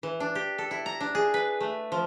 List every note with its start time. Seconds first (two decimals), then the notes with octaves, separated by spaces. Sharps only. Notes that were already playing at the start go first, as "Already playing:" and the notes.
0.03 E3
0.20 D4
0.35 G4
0.58 A4
0.71 E4
0.86 A#5
1.00 D4
1.15 G#4
1.34 B4
1.61 A3
1.92 F3